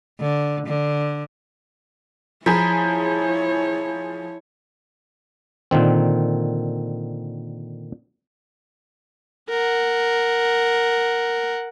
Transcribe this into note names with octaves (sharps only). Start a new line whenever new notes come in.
D3
D3
F3 E4 G#4 C#5 A#5 B5 B6
A#2 D3 D#3 C4
A#4 F#5